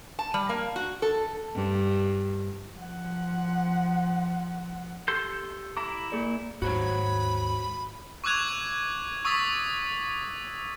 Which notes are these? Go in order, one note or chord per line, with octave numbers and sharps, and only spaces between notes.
A5
G3
A#3
F#4
A4
G2
F3 F#5
G4 A4 C6 G6
E4 A#5 D6
A#3 G#4 D5
D#2 G#2 F#4 C5 C#5 B5
C#6 D6 E6 F#6 G#6 F7
C#6 D#6 E6 A6 B6